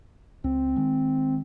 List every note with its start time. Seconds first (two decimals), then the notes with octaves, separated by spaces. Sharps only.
0.44 C#2 C4
0.76 D#3 G#3